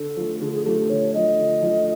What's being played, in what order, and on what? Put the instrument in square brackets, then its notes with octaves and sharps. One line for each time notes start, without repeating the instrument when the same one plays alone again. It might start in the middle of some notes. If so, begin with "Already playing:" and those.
Already playing: [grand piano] D3 [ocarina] A4
[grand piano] F3 A3
[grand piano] D3 [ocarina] G#4
[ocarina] G#4
[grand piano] F3 A3 [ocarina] G4
[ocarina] G4
[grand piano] D3 [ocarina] C#5
[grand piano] F3 A3 [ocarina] D#5
[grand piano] D3
F3 A3